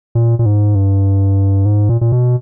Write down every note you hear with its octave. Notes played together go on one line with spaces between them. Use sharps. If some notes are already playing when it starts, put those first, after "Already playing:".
A#2
A#2
G#2
G2
G#2
A#2
A#2
B2